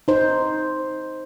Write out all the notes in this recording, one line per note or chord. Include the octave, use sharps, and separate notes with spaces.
D#4 C5